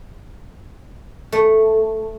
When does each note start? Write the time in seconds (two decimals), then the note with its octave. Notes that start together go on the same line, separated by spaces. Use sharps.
1.32 A3